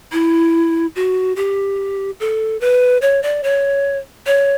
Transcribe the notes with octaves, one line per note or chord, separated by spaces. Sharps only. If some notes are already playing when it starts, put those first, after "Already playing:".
E4
F#4
G4
A4
B4
C#5
D5
C#5
C#5